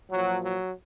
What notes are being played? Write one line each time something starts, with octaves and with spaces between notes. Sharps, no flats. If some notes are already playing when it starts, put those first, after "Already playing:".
A#2 F3 F#3
F#3